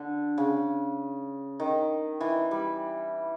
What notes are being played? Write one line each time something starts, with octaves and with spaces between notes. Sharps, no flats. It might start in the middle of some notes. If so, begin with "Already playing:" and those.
Already playing: D3
C#3
D#3
E3
G3